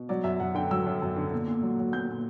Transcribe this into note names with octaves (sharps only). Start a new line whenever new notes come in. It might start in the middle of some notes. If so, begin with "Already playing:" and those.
Already playing: B2
F#3 D5
F#2 E5
F#2 F#5
D3 G5
F#3 E6
F#2
F#2
D3
A#2
A#2
F#3
F#3
A#2 G6
A#2